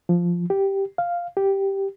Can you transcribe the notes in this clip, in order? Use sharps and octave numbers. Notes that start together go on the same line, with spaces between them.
F3
G4
F5
G4